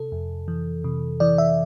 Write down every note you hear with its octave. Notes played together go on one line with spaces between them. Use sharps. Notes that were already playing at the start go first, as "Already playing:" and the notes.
Already playing: C3 A4
F2
E3
C3
E3 D5
E5